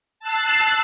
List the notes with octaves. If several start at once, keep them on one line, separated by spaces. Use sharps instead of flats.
A5 E6 F#6 C7